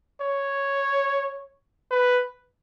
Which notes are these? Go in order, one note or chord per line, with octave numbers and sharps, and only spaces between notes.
C#5
B4